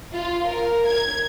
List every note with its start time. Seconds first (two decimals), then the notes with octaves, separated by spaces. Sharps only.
0.13 F4
0.47 A#4
0.88 G#6